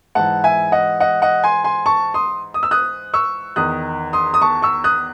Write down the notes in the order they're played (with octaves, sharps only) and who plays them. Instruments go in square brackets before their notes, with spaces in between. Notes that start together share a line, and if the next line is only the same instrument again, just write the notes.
[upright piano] G#2 E3 F#5 A5
E5 G#5
D#5 F#5
D#5 F#5
D#5 F#5
G#5 C6
G#5 C6
A5 C#6
C6 D#6
D#6
E6
D#6 F#6
C#6 E6
E2 D#3 D#6 F#6
C6 D#6
D#6
A5 C#6
C#6 E6
D#6 F#6